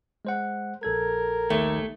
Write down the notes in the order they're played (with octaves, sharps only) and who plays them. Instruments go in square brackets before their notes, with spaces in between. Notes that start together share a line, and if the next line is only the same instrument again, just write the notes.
[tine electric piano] G#3 C5 F#5
[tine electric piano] A#1 A4 G#6 [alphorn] A#4
[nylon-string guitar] D#2 [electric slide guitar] A3